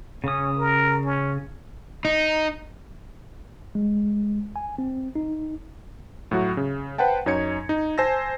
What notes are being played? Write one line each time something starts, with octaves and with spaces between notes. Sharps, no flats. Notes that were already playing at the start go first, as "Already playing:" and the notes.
C#3 C#4 D#6
A#4
C#4
D#4
G#3
G#5
C4
D#4
A2 F#3 F#4
C#3
B4 C5 F#5 G5 A5
F#2 D#4 C#5 G#6 C#7
D#4
C5 G#5 A5 E6 A#6